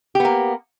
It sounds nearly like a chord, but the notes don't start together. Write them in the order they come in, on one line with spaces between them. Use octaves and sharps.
G4 B3 A#3